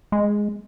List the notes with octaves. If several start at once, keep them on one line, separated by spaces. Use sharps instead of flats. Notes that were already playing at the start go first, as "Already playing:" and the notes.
G#3